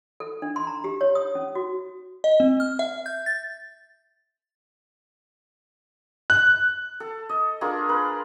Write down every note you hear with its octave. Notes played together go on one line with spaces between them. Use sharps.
A4
D4
C6
A#5
G4
C#5
D#6
C#4
F#4
D#5
C4
F6
E5
G6
A6
F#6
A4
D#5
D4 F4 G#4 A#4
A#4 B4